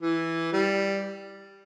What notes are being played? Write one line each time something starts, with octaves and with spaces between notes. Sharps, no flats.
E3
G3